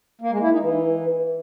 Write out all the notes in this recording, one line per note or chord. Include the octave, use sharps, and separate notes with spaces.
A#3
G#3
E4
D#4
E3